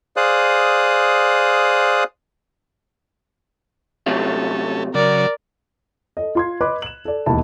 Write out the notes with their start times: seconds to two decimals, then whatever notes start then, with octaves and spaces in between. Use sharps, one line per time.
0.16 G#4 C5 D5 F5 D#6 F#6
4.06 C3 F#3 A3 C#4 A4
4.94 C#3 F#3 A#4 D5
6.17 A4 D#5
6.35 F4 C6 G#6
6.61 B4 D#5 B5 C6 D6 F#6
6.82 E7 F#7
7.05 A4 D5
7.26 E1 D#2 D#3 E4 E5 A5